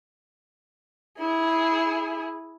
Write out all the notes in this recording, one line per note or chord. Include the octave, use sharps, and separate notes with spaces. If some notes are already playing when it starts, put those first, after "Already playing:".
E4 G#4